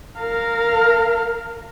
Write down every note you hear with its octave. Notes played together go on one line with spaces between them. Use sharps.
A#4 F5